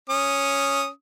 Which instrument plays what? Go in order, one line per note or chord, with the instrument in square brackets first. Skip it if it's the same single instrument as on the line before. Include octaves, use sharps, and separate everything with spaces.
[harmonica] C#4 D#6